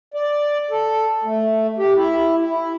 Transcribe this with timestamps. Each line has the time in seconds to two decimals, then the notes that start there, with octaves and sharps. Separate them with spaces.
0.14 D5
0.71 A4
1.24 A3
1.78 G4
1.95 E4
2.46 E4